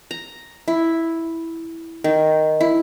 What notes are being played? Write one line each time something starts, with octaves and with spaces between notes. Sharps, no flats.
A#5
E4
D#3
E4